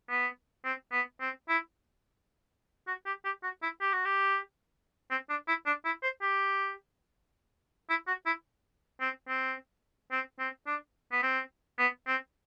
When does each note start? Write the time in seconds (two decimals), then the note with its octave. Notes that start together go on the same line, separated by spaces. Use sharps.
0.10 B3
0.65 C4
0.93 B3
1.21 C4
1.49 E4
2.88 F#4
3.06 G4
3.25 G4
3.43 F#4
3.63 E4
3.81 G4
3.93 F#4
4.05 G4
5.11 C4
5.30 D4
5.48 E4
5.66 D4
5.85 E4
6.03 C5
6.22 G4
7.90 E4
8.07 F#4
8.26 E4
9.01 C4
9.29 C4
10.12 C4
10.40 C4
10.67 D4
11.12 B3
11.23 C4
11.79 B3
12.07 C4